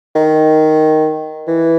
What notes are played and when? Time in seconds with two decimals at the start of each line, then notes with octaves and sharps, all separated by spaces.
0.16 D#3
1.48 E3